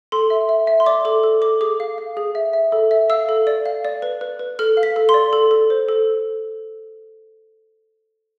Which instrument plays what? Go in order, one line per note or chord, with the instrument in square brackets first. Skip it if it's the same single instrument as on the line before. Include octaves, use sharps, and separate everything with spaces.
[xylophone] A4 C6
E5
E5
E5
C6
D5 D6
A4 D6
A4
A4 D6
G#4 D6
F5
F5
G#4
E5
E5
A4
E5
F5 E6
A4
D5
F5
D5
B4
B4
B4
A4 F6
F5
B6
A4
C6
D5
A4
A4
C5
A4